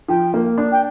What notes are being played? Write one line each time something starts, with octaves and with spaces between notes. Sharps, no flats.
F3 G5
A#3
D4
G5